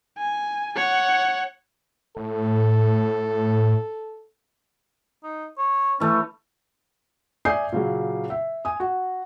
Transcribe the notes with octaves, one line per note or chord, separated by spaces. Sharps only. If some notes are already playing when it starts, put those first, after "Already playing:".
G#5
C#5 F#5
A2 A4
D#4
C#5
E3 A3 C#4
D5 E5 G#5 D#6 G6 C7
A#2 C#3 F#3
E5
G#5 D#6
F#4